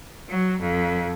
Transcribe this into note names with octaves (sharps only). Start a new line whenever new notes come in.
F#3
F2